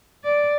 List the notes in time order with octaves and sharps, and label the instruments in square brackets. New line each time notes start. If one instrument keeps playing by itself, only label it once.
[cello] D5